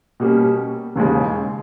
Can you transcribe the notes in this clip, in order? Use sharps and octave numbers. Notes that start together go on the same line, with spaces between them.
B2 G3 A#3 C#4
E1 D#2 C#3 G#3